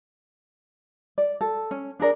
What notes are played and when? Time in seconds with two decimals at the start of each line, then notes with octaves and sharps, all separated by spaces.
1.18 D5
1.41 A4
1.71 C#4
2.00 D4 G#4 A#4 D5